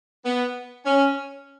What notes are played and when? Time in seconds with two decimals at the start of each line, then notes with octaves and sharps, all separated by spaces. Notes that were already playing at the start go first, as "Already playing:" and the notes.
0.24 B3
0.85 C#4